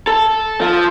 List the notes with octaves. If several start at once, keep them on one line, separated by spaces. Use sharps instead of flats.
A4
F3